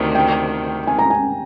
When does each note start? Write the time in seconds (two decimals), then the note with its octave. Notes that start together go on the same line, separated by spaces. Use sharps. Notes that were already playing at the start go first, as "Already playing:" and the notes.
Already playing: D2 C3 D#3
0.15 G5
0.87 G#5
0.99 A#5
1.10 G#5